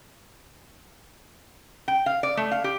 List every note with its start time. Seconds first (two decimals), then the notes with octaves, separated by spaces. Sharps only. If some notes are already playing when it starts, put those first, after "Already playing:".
1.88 G5
2.06 F5
2.23 D5
2.37 A3
2.51 F5
2.64 G4